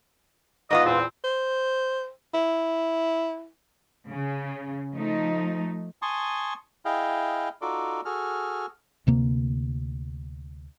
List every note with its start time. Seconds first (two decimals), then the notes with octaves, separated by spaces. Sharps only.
0.71 G#2 B3 F4 D#5
0.85 E2 A#2 C4
1.24 C5
2.34 E4
4.09 C#3
4.93 F3 A3 D#4
6.02 G#5 A5 C6 C#6 D#6
6.85 E4 G#4 D#5 F5 G5
7.61 D#4 F4 F#4 A4 D5
8.05 F#4 G#4 A4 F6
9.07 D2 C3 A#3